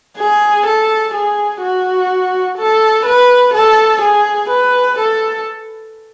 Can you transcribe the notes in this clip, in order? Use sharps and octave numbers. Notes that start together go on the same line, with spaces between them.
G#4
A4
G#4
F#4
A4
B4
A4
G#4
B4
A4